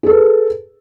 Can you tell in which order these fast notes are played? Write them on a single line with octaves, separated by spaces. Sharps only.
G#4 A4 B4